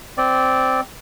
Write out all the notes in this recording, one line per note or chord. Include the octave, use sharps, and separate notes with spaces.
C4 D5